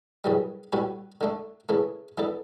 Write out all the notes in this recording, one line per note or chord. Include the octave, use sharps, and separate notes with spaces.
F#2 C#3 E3 G3
A2 G3 C#4 F#4 B4
D3 A3 D4
C#3 E3 A3
E3 B3 D4 A4